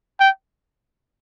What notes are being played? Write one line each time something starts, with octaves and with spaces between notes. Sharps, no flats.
G5